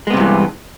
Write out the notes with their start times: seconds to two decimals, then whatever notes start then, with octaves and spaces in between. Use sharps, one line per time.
0.07 G#3
0.10 B3
0.13 C3
0.17 G2
0.20 E3